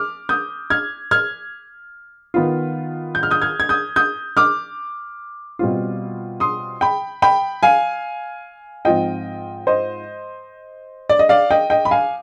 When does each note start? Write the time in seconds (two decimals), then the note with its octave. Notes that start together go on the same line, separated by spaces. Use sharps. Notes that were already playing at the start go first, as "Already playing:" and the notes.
Already playing: D6 F6
0.29 D#6 G6
0.70 F6 G#6
1.11 F6 G#6
2.34 D#3 B3 F4
3.15 G6
3.23 F6
3.31 D#6 G6
3.42 F6 G#6
3.60 G#6
3.69 D#6 G6
3.96 D#6 G6
4.37 D6 F6
5.59 B2 G3 C4 F4
6.40 C6 D#6
6.81 G5 B5
7.22 G5 B5
7.63 F5 G#5
8.85 G#2 F3 C4 F4 D#5 G5
9.67 C5 D#5
11.09 D5
11.19 D#5
11.29 D5 F5
11.51 D#5 G5
11.70 D#5 G5
11.85 B5
11.91 F5 G#5